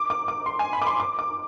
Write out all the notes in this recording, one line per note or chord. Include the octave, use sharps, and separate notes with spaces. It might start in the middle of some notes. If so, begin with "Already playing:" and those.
Already playing: D6
D6
D6
C6
G#5
B5
D6
C6
D6
D6